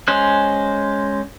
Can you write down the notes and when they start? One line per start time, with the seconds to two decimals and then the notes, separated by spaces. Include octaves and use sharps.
0.08 G#3 C#4 C5 F#6